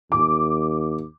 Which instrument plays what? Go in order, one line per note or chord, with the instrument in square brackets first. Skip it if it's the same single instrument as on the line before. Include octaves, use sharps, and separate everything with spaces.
[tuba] D#2 [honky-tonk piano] D6